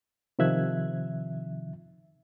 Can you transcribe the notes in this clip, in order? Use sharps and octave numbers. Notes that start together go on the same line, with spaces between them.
C3 D#3 F3 E5 F#6 G#6